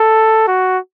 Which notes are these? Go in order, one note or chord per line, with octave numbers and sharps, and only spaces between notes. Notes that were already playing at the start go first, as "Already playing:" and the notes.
Already playing: A4
F#4